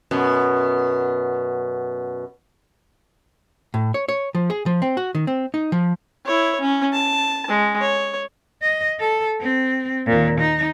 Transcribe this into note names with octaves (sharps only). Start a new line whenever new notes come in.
F#2 B2
A2
C#5
C#5
F3
G#4
F3
C4
F#4
D#3
C4
D#4
F3
E4 C#5
C#4
A5
G#3
C#5
D#5
A4
C4
D#2 A#2
D#4